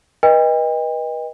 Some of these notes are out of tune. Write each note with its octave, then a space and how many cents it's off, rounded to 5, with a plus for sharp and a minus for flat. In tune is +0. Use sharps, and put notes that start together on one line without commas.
B4 -35 D#5 +0 G5 +40